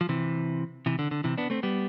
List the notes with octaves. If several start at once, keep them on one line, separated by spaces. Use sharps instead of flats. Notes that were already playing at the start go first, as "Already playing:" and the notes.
F3
C3 E3
C3 E3
D3
D3
C3 E3
B3 D4
A3 C4
G3 B3